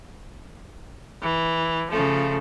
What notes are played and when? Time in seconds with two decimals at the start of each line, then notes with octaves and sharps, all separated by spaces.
1.20 E3
1.89 C#3 F3 A3